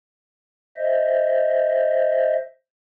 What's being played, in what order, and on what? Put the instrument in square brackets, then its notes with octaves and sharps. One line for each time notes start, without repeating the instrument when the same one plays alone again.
[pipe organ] C5 D#5 E5